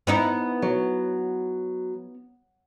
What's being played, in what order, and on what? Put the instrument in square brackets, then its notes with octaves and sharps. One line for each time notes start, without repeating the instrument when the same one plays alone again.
[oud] B3 D#4 E4
[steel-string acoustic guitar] F#3